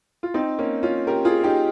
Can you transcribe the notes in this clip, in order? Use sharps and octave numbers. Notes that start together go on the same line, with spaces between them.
F4
C4 D#4
A#3 C#4
C#4 F4
G4 A#4
F4 G#4
D#4 G4